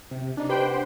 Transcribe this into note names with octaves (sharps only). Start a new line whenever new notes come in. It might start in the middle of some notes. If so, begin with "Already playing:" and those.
C3
D4 D#4
G4 B4 C5 G5 B5 C6
C5 F#5